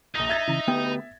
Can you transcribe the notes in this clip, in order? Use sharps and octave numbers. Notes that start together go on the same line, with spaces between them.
A#1 D#4 A#5 D#6 A#6
E5 G#6 A6
C#3 E3 A#5
D2 B3 G4 B4 G5